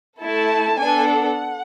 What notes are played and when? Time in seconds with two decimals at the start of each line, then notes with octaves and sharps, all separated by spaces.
0.22 A3 E4 A4 A5
0.80 B3 D4 A4 G#5
1.09 F#5